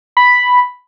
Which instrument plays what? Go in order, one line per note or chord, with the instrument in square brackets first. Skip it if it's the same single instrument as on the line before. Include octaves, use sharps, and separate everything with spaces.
[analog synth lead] B5